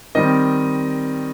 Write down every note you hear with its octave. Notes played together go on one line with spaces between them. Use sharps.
D#3 G3 C4 D#5